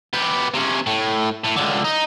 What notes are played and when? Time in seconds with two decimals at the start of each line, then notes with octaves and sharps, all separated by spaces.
0.14 B3 G4
0.54 C3 C#4
0.86 A2
1.44 A2
1.56 C#2 D3
1.84 D#4